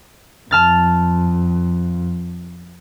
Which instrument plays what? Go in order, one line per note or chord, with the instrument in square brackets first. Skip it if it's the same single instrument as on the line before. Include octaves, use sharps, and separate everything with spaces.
[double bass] F2 [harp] A5 F6 A6